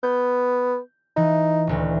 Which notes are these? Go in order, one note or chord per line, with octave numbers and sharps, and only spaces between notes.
B3 G6
E3 D#4
D#1 D2 E3